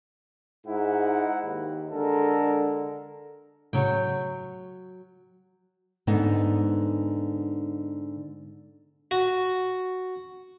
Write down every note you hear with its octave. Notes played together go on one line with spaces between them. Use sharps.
G#2 D#4 E4 F#5
D#2
D3 G#3 A4 A#4
A2 C#3 F#3 G5 C#6
G#2 D3 B3 D#4
F#4